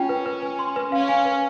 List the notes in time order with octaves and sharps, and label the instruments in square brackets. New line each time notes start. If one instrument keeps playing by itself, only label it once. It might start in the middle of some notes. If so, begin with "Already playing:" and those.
Already playing: [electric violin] C#4 [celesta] F4 G5
[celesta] B4
B4
G#5
C6
B4
[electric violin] C#4 [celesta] F5
[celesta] G#5
B4